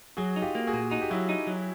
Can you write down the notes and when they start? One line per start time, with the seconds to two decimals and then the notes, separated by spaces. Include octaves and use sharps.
0.17 F#3 F#4 G#4
0.36 D#4
0.42 F4 G4
0.55 A#3
0.67 F#4 G#4
0.73 A#2
0.91 D#4 F#4
1.02 G4
1.10 F#3 E4 F#4
1.29 D#4
1.47 F#3